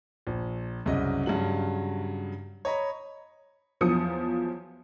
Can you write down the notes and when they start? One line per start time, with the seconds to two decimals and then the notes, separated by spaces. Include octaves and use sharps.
0.27 A#1
0.86 C2 F#2 C#3 D#5
1.26 G2 C#3 F#3 F#7
2.65 C#5 D#5 A#5 B5
3.81 E2 F3 F#3 D#6 C#7